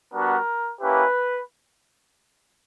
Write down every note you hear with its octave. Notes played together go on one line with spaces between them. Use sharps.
G3 B3 D4 F#4 A#4
A#3 C#4 E4 G4 B4